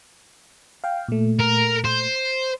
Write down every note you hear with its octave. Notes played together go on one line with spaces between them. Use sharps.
F5 G5
A#2 A3
A#4
C5